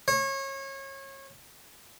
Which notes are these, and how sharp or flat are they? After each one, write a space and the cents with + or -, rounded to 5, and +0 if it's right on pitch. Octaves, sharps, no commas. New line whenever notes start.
C#5 -30